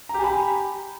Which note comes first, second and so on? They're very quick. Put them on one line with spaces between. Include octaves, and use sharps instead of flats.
A#5 G4 G#5 B5